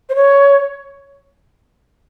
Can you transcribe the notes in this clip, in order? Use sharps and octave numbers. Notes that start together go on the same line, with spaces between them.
C5
C#5